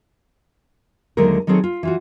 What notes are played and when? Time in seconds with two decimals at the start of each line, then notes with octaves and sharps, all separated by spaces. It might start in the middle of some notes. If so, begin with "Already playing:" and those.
1.17 D#2 D3 F#3 G#3 A3 A#4
1.47 D#3 F#3 C4 G#4 A4 C#5
1.64 F4
1.83 E3 F4 F#4